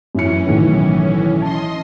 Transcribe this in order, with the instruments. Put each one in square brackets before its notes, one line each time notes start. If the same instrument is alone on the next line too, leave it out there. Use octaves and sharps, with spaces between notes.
[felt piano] F#2 E4 C#7 [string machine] E3 C#4
[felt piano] B1 A2 D#3
[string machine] D#5 C6 [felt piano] A5